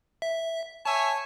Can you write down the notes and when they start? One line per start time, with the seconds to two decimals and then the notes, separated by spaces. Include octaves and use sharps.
0.22 E5
0.86 C#5 E5 G#5 A5